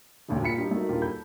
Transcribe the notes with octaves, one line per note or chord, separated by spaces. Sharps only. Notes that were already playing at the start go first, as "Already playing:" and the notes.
E1 A1 D2 G3 A3 G4
A#2 F4 G5 B5 B6 C#7
G2 G3 D#4
A3 D#4 F#4 A#4
D#1 G2 A#3 F4 G4
A4 B5 G6